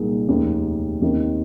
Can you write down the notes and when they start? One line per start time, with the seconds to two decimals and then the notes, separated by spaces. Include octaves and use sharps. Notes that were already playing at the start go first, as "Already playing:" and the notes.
Already playing: C2 A#2 G#3 D#4 A#4
0.28 F1 D#2 D#3 G#3 D#4
1.02 D#2 D#3 C4